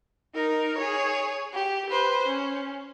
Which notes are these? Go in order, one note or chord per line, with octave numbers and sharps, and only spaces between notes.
D#4 A#4
G#4 C#5
G4
B4 C5
C#4